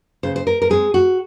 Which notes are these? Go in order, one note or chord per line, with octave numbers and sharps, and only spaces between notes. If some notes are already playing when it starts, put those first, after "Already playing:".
C#3 C5
C5
A#4
A#4
G#3 C4 G#4
F#4